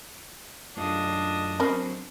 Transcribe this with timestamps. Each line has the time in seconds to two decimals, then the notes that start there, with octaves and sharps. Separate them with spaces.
0.77 F#2 A3 D4 F4 D#5
1.60 F#3 C4 C#4 A#4 C5 B5